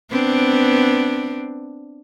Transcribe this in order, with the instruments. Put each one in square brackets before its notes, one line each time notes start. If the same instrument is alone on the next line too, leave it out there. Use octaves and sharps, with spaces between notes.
[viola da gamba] B3 C4 D4